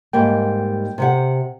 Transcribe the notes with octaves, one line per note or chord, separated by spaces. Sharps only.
G#2 G3 A#3 G5
C3 G4 F#5